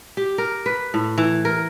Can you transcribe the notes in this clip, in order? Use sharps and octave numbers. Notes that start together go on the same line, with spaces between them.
G4
A#4
B4
A2
E3
A#4